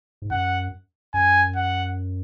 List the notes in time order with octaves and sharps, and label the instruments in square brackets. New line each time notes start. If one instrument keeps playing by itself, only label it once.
[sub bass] G#2
[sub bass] F#2 [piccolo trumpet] F#5
[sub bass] F#2 [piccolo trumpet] G#5
[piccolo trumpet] F#5